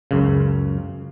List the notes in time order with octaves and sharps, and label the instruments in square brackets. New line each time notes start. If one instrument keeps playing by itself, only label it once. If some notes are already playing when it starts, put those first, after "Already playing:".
[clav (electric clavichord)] C#2 F#2 C#3